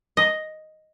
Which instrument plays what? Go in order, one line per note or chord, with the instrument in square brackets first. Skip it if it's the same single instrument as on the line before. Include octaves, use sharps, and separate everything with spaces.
[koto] D#5